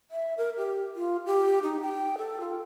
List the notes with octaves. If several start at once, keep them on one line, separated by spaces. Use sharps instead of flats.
E5
A#4
G4
F4
G4
D#4
G5
A4
F4